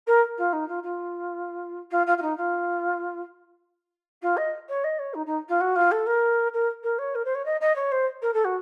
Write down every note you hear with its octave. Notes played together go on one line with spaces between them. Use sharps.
A#4
F4
D#4
F4
F4
F4
F4
F4
D#4
F4
F4
D#5
C#5
D#5
C#5
D#4
D#4
F4
F#4
F4
A4
A#4
A#4
A#4
C#5
A#4
C5
C#5
D#5
D#5
C#5
C5
A#4
A4
F#4